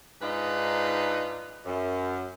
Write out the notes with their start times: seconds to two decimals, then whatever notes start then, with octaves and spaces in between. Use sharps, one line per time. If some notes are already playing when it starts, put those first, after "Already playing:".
0.22 G#2 D4 D#4 F4 B4
1.65 F#2